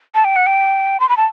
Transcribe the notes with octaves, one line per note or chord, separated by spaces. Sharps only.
A5
G5
F#5
G5
C6
B5
A5